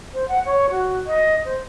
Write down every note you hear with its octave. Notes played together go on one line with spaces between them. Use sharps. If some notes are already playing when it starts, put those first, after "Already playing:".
C5
F#5
C#5
F#4
D#5
C5